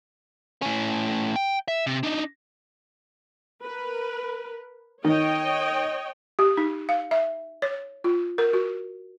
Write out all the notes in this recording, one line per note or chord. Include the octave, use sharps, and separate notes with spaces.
A2 C#4
G5
E5
C3
D4 D#4
A#4 B4
D#3 C#5 D#5 G5
G4
D#4
F5
E5
C#5
F4
A#4
F#4